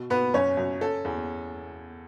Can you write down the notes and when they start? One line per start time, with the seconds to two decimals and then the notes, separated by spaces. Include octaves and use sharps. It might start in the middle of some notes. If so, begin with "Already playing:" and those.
Already playing: B2
0.10 B2 B3 B4
0.34 F#2 C#4 C#5
0.57 F#2
0.81 C#4 A4
1.05 E2